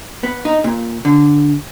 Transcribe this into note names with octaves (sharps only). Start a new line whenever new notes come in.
B3
D#4
A#2
D3